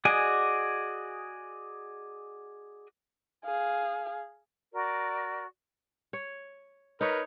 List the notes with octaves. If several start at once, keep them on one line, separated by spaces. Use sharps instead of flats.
F#4 G#4 D5 D#5 G#5
G#4 F5
F#4 A#4 D5
C#5
D#4 A#4 B4 C#5